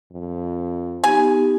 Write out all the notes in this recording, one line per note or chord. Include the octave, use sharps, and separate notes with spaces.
F2
B3 D#4 G4 G#5